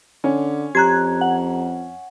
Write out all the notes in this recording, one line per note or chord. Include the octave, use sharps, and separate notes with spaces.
D3 C#4
F2 G4 A#5 F#6 G#6
F#5